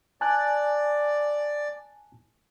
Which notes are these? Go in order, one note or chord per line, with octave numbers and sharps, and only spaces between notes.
D5 G#5 A5 F#6